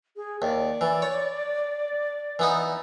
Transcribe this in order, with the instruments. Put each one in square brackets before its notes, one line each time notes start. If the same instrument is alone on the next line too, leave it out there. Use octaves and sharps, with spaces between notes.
[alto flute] G#4
[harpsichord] D#2 [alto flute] D5
[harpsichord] E3
C#5
E3 B3 D#4